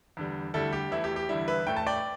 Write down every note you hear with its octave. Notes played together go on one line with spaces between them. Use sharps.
E2 D3 G3
D2 D3 G3 E4 A4
G4
E2 E3 A3 E4
G4
G4
E2 D3 G3 E4
B4 E5
A2 A3 G5
A5
D5 G5